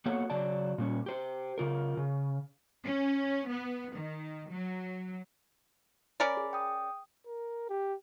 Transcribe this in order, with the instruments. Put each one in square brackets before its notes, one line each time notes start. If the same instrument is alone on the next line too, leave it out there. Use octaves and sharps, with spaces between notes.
[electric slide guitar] A#3 B3 F#4 A4 C#5 F#5
C#3 F#3 D5 A5
A#2 G3 C#4
G4 C5
C#3 F4 A#4
C#3
[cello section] C#4
B3
D#3
F#3
[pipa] C#4 A#4 D5 [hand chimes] B5
[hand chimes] G#4
G5 D#6
[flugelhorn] A#4
G4